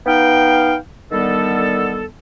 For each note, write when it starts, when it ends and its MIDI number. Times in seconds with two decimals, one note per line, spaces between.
0.07 0.76 59
0.07 0.76 63
0.07 0.76 77
0.07 0.76 79
1.12 2.05 50
1.12 2.05 51
1.12 2.05 55
1.12 2.05 59
1.12 2.05 69